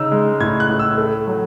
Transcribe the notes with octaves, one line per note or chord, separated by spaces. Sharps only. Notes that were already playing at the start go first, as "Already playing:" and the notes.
Already playing: C#3 D#4 E6
G#3
A2 G#6
F#6
A2
E6
A3
F#3